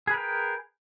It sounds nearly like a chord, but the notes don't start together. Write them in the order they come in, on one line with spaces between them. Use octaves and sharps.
G#4 B4 A#4 G5